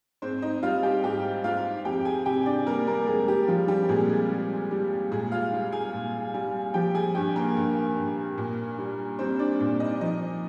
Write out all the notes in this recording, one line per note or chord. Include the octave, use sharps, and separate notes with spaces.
G#2 C4 C5
D#4 D#5
G3 F4 F5
G4 G5
G#2 G4 G5
G#2 F4 F5
F2 G4 G5
G#4 G#5
C3 G4 G5
D4 D5
G3 A#3 A#4
A#3 A#4
F2 G#3 G#4
G3 G4
F3 G3 F4
G3 G4
A#2 G#3 G#4
G#3 G#4
G3
G3
A#2 G#3 G#4
F4 F5
G3
G#4 G#5
A#2
G3
F3 G4 G5
G#4 G#5
G2 G4 G5
A#3 A#4
G2
G2
A#2
G3
G3 C4 C5
D4 D5
A#2 D4 D5
D#4 D#5
F3 D#4 D#5